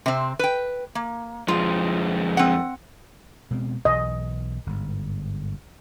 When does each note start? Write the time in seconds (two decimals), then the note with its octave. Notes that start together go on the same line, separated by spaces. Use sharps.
0.06 C3 C4
0.39 B4 G5
0.95 A#3
1.48 F2 G#3 F4
2.37 C4 F#5
3.51 B2 G#3 C4
3.85 B1 E3 D#5
4.67 G1 G#2